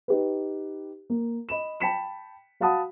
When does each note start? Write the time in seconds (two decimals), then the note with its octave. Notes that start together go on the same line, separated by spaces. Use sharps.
0.08 D#4 G4 B4
1.10 A#3
1.49 D#5 B5 E7
1.80 G5 A5 B5 B6 C#7 E7
2.60 F#4 F5 F#5 A5 B5 D#6